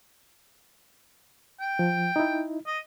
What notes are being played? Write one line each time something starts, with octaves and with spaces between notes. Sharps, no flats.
G5
F3
D#4 E4
D#5